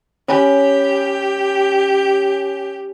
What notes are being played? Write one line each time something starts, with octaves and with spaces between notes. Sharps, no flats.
C#4 G4 B5